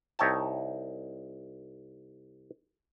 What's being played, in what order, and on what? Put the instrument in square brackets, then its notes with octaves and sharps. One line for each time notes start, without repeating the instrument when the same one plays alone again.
[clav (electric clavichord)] C2 D#4 C#5 E5 G5 A5